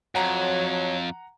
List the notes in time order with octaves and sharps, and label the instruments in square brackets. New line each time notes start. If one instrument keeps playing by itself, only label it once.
[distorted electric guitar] F2 [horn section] F#3 [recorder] C#5 [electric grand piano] F#5 A#5